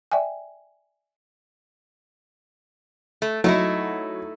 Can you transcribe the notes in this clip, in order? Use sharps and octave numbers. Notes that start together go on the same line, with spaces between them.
D5 E5 G5 G#5
A3
F#3 A3 D#4 E4